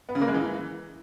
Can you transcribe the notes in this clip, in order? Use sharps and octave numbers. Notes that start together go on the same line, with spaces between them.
B3
C#3
A#3
G#3
E3